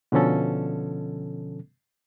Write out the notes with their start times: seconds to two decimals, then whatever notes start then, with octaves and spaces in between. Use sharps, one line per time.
0.12 B2 D3 F3 C#4 A4